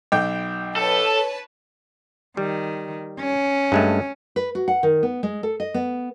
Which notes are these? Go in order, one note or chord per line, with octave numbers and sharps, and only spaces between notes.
B1 G5
A4 B4 C#5 A5
D#3 G3
C#4
G2 G#3 A3
B4
F#4
F#5
D#3
B3
G#3
A4
D#5
B3